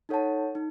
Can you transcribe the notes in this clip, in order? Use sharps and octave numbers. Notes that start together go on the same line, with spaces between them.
D#4 A4 C#5 F#5 A5
D#4